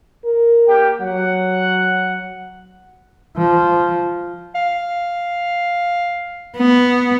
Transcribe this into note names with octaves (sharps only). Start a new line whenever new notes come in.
A#4
A#3 G4 G5
F#3 F#5
F3
F5
B3